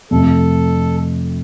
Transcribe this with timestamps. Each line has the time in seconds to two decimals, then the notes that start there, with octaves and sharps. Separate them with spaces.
0.11 F2 C3 F3 A3 A4